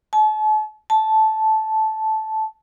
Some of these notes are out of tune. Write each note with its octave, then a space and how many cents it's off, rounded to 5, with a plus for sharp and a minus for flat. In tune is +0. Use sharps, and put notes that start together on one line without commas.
A5 -40
A5 -10